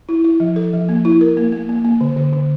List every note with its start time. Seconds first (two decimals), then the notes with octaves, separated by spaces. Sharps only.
0.09 E4
0.24 E4
0.40 F3
0.56 A4
0.73 F3
0.89 A#3
1.05 E4
1.21 A#4
1.37 A#3
1.52 A#3
1.69 A#3
1.85 A#3
2.01 D3
2.17 D3
2.33 D3